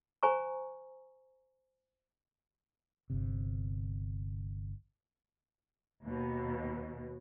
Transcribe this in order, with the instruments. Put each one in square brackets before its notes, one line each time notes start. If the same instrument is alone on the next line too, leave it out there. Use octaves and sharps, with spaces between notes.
[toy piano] C5 G#5 A#5 C#6
[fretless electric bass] G1 C3
[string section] D#2 B2